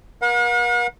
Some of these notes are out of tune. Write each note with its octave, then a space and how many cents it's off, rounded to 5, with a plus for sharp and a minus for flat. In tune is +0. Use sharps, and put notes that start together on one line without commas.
A#4 +45 F#5 -45